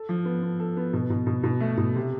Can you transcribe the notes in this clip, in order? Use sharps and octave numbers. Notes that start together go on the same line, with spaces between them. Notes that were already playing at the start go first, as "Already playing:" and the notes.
Already playing: A4
F3
B3
B3
A4
B3
B2
B2
B2
B2
A3
B2
C3